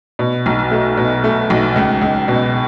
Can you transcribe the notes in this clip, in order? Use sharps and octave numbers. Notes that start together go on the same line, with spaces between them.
B2
B1
A3
B2
A3
B1
C#2
C#2
B2